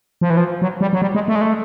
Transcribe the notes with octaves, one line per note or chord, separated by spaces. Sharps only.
F3
E3
F3
F#3
G3
F#3
G3
G#3
A3
G#3
A3